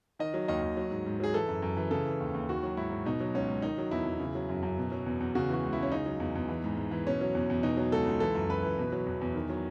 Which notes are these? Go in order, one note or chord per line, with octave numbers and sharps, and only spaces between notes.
D#3 D#5
F#3
D#2 D#5
D#2
F#3
G#2
G#2
F#3 G#4
E3 A4
F#2
F#2
E3
C#3 A4
E3
D#2
D#2
D#3 F#4
F#3
G#2 E4
G#2
B2 D#4
F#3
C#2 C#4
C#2
D#3 D#4
F#3
E2 E4
E2
C#3
F#3
F#2
F#2
B2
F#3
E2
E2
C#3 F#4
E3 F#4
C#2
E4
C#2 C#4
C#3 D#4
F#3
E2
E2
E3
G#2
G#2
E3
B2 C#4
F#3
E2
E2
B2 D#4
F#3
C#2 A4
C#2
E3 A4
F#2
F#2 B4
E3
B2
F#3
E2
E2
D#3
F#3